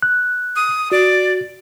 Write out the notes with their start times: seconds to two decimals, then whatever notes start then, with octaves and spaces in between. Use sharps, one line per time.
0.02 F#6
0.56 D#6
0.92 F#4 D5